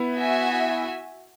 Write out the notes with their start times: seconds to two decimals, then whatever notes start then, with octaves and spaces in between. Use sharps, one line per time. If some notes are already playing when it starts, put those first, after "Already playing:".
Already playing: B3 E4
0.17 F#4 E5 G#5